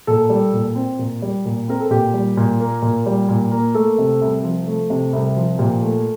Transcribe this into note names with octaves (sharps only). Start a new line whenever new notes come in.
A#2 A4
G3
A#2
C4
A#2
G3
A#2
C4 A#4
A4
A#2 G4
G3
A#2
A#3
A#2
G3
A#2
A#3
A3 A4
C3
C2
F3
A3
C3
C2
F3
A#2 G4
A3